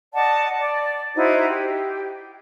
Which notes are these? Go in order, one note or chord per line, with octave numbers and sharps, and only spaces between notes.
D5 D#5 F#5 A5
D5
D#4 E4 F#4 C5
G4